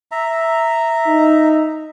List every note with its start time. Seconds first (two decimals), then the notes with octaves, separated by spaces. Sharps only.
0.11 E5 A#5
1.07 D#4